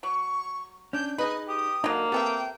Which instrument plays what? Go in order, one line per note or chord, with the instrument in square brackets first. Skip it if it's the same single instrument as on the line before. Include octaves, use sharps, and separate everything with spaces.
[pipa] F#3 [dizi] C#6
[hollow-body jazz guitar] C#4 D4 [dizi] G6
[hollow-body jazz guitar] D#4 G#4 [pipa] B4 [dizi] D#5
[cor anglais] G4 [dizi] D#6
[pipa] D3 F#3 [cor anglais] A#3 [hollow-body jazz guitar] D#4 D#5
[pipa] B3 A4 E5 [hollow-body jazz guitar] C4 G4 [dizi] G5